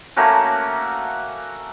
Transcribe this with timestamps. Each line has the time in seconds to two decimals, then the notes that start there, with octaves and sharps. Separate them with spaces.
0.16 A3 A#3 C#4 F#4